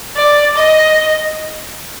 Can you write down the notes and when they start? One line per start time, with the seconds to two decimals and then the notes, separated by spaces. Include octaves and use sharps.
0.16 D5
0.56 D#5